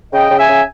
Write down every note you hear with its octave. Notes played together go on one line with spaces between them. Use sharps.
C#3 D#5 G5
C#3
E5 G#5
C#3